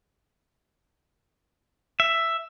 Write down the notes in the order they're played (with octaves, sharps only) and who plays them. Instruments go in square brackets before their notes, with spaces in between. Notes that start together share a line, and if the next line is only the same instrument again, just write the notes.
[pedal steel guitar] E5